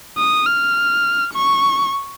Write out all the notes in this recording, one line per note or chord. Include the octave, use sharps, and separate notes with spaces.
D#6
F6
C#6